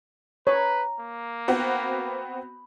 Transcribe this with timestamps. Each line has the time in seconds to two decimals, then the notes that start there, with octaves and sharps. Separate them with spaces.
0.47 B4 C#5 A#5
1.00 A#3
1.48 B3 C4 F#4 B5